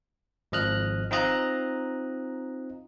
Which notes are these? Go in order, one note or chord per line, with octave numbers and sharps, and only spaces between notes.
G#1 F3 D#5 F6 F#6
C4 D#4 F4 D#5 A#5 F#6